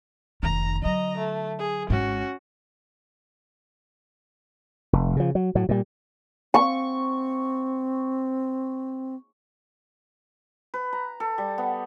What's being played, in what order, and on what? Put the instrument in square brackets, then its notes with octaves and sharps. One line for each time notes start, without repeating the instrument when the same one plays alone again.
[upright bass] F1 D#3 [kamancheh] A#5
[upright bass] D3 F#3 [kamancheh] D#5 A#5
[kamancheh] A3
G#4
[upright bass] G#1 G#2 [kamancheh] C#4 F#4
[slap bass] F1
C#3 F3
F#3
A2 F#3
A#2 G3
[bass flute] C4 [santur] C#6
[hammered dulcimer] B4
A#5
A4
G3
B3